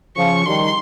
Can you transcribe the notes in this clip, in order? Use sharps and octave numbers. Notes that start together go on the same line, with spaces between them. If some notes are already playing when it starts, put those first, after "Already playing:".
C#3 F3 C#6
D#3 G3 C6